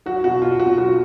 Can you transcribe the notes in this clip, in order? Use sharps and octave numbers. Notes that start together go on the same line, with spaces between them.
F#3 F#4
B2 F#4
B2 F4
F#3 F#4
F#3 F#4